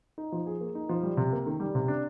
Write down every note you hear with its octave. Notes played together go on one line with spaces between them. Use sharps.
D#4
F3
G#4
A#3
D#4
F3
G3
C3
A#3
D#3
G3
C3
D4